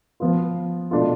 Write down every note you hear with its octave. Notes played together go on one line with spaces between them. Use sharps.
F3 B3 F4
B2 A3 D4 F4